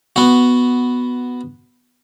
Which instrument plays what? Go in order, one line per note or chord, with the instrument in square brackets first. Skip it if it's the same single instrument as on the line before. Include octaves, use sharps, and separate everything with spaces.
[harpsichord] B3 F#4